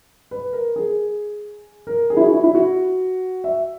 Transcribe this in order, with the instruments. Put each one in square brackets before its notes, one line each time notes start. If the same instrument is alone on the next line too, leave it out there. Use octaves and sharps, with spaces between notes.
[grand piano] B4
A#4
G#4
A#4
G#4
E4
F#4
E4
E4
F#4
E5